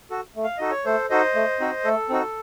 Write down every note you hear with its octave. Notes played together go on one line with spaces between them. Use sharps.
F#4 A4
A3
F5
D#4 F#4 A4 D#5
C#5
A3 A4 C5
D#4 F#4 A4 C5 D#5
A3
C4 D#4 F#4
A3 A4
C4 D#4 F#4